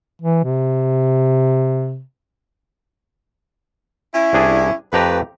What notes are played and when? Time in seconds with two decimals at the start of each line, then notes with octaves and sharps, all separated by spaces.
0.22 E3
0.44 C3
4.13 C#4 E4
4.33 C2 D4 G#4
4.93 F2 A3 G4 B4 A#5